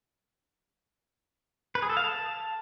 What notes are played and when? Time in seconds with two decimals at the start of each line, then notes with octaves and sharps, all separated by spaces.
1.75 B4
1.82 G#4
1.90 A4
1.97 F5
2.04 A5